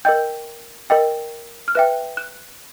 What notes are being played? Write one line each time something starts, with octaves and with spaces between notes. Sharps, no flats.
A#4 D#5 G5 G6
A#4 D#5 G5
F6
B4 E5 G5 F#6
F#6